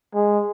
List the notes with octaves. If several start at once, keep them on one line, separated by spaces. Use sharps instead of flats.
G#3